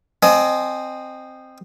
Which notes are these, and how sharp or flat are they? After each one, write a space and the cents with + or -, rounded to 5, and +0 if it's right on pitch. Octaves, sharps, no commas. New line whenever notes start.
C4 +0 D#5 -20 G#5 +25